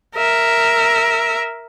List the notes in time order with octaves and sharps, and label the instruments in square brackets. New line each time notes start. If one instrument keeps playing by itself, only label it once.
[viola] A#4 E5